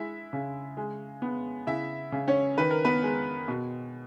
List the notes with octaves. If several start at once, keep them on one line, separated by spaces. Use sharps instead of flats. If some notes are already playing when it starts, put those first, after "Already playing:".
Already playing: G#3 E4 E5
C#3
G#3
B3
C#3 E4 E5
C#3
C#4 C#5
D#3 B4
A#4
B3 B4
G#3
B2